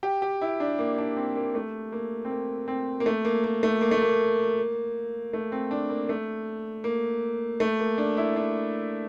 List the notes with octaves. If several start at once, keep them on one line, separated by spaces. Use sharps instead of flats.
G4
G4
E4
D4
A#3
D4
C4
A#3
A3
A#3
C4
A#3
C4
A#3
A3
A#3
A#3
A3
A#3
A3
A#3
A3
C4
D4
A#3
A3
A#3
A3
A#3
D4
E4
D4